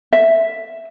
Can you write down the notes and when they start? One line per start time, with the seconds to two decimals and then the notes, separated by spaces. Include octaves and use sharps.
0.13 E5